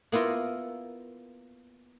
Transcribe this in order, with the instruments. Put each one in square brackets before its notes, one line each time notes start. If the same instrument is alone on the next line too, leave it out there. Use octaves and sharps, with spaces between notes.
[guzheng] A#3 B3 E4 F4 A#4